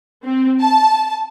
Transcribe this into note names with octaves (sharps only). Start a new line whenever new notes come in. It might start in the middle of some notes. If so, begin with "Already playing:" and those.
C4
A5